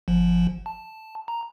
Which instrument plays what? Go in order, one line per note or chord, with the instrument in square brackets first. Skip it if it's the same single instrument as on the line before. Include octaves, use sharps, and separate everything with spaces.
[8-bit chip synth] G1 F3
A5
A#5